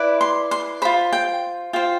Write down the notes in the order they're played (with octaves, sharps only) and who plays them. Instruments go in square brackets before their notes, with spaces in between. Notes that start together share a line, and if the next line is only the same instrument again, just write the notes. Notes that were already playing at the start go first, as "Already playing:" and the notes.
Already playing: [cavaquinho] E4 B4 D5
C6
C6
F4 C5 B5
G5
F4 C5 G5